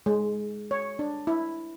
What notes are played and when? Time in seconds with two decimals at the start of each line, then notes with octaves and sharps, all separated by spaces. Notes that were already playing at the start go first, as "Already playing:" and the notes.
0.06 G#3
0.71 C#5
0.99 D4
1.27 E4